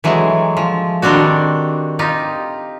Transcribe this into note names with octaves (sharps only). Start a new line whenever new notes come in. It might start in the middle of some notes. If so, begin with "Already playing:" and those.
E3 F#3 G#3 A3
F3
D#3 G3 C4 D4 F#4
D#4 F4 G4